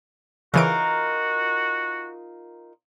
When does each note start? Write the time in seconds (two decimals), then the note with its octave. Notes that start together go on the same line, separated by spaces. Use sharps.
0.54 C#3 E3 D#4 F4 F#4 A#4 D7